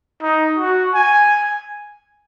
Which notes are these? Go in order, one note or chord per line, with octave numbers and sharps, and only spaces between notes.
D#4
F#4
G#5